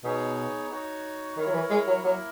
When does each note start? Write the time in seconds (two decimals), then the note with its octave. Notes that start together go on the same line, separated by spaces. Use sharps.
0.04 B2 B3 D#4 G#4 C#5
0.71 D#4 F#4 C#5
1.37 D#3 E4 A#4 C#5
1.47 F#3
1.54 E3
1.70 G#3
1.87 F#3
2.03 F#3 A#3 E4 A#4